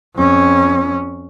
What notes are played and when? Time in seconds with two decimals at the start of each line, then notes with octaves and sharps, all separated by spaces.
0.16 F2 C#4